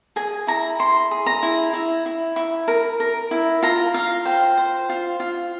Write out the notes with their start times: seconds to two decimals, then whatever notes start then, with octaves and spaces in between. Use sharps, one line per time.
0.16 G#4 G#5
0.47 E4 A#5
0.79 E4 C6
1.11 G#4
1.26 A#5
1.43 E4
1.73 E4
2.06 E4
2.36 E4
2.68 A#4
3.00 A#4
3.31 E4
3.62 F4 A#5
3.94 F4 F5
4.25 C5 G5
4.57 C5
4.89 F4
5.20 F4